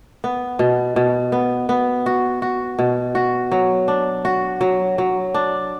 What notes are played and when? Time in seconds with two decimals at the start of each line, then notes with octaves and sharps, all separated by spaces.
0.24 B3
0.59 B2
0.96 B2
1.32 B3
1.69 B3
2.06 F#4
2.42 F#4
2.79 B2
3.15 F#4
3.52 F#3
3.88 D4
4.25 F#4
4.61 F#3
4.98 F#3
5.34 D4